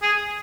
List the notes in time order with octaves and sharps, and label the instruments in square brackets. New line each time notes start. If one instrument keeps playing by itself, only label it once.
[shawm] G#4